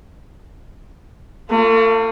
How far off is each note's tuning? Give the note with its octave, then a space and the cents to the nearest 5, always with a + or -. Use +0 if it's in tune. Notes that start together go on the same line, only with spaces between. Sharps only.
A3 +40 F4 +0